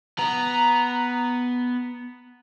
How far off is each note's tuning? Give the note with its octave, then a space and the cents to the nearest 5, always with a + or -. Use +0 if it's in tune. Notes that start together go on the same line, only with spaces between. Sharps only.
B3 +0 A#5 +0